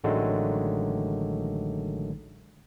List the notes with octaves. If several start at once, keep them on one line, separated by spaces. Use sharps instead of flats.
A1 D3 D#3 F#3 G#3 A3